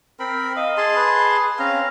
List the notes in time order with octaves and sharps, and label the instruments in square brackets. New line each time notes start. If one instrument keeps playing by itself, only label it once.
[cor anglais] C4 [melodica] A#4 B5
[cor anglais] D#5 [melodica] F5
[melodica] G#4 A5 C6
[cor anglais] B4
[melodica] C4 C#4 A#5 [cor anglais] F5